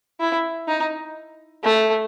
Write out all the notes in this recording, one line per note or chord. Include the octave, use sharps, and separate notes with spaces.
E4
D#4
A3